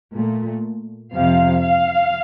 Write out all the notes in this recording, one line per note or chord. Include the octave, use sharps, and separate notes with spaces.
A#2 A3
F2 C3 F3 F5
F5